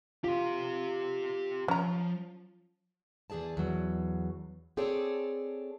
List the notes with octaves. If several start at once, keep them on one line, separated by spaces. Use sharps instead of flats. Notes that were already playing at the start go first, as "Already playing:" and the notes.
F4 G4 C6
F3 C#4 A#5
E2 F#3 G#4 D5 A5
E2 F#3
C4 G#4 A4 C#5 D5